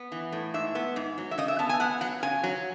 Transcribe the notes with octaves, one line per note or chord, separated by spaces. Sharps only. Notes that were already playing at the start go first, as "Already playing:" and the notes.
Already playing: B3
E3
A2
G#2 E5
B3
G#2
F#3
E5
C#3 D#5
E5
B3 A5
G#5
B3 F#5
F#3 F#5
C#3 G#5
F#3